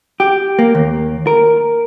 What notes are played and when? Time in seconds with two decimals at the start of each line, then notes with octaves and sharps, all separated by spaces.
0.20 G4
0.59 A#3
0.75 D#2
1.27 A#4